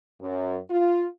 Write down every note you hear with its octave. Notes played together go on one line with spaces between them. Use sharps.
F#2
F4